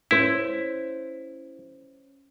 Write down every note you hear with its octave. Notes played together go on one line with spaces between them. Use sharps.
C#4 E4 C5